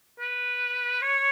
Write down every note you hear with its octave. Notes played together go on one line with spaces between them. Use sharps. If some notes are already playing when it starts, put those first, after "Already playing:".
B4
C#5